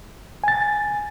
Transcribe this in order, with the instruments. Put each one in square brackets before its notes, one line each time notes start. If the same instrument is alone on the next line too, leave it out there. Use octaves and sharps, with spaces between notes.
[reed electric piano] G#5 A6